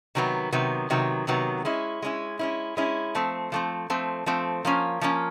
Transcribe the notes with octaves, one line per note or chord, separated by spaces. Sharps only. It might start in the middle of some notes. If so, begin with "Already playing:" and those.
C3 D#3 F#3 B3
C3 D#3 F#3 B3
C3 D#3 F#3 B3
C3 D#3 F#3 B3
G#3 C#4 E4
G#3 C#4 E4
G#3 C#4 E4
G#3 C#4 E4
F3 A3 C4
F3 A3 C4
F3 A3 C4
F3 A3 C4
F3 A#3 C#4
F3 A#3 C#4